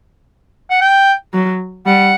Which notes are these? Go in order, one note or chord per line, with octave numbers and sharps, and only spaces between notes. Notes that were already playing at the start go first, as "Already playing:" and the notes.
F#5
G5
F#3
G3 F#5